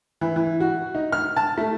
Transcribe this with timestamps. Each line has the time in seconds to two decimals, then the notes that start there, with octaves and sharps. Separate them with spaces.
0.21 E3
0.36 E3
0.60 F#4
0.95 D#4
1.12 F6
1.36 A5
1.58 A3